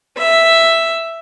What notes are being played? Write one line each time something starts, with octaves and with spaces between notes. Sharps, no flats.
E5